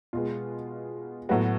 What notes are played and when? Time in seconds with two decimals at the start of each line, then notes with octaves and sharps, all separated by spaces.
0.13 B2 G#3 B3 F4
1.29 A2 F#3 B3 F#4